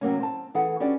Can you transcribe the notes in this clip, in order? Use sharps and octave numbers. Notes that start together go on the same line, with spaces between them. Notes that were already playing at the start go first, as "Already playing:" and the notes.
C3 F#3 A#3 C#4
C4 A5
E3 G#4 A4 F#5
C#4 D4 F#4 G4 B4 D5